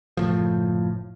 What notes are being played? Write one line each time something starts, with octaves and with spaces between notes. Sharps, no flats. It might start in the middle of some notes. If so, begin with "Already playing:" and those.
F#1 C2 A2 F3